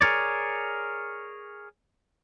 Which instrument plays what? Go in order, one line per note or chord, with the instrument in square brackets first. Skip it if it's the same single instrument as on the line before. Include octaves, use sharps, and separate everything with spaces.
[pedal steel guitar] G#4 A#4 C#5 D5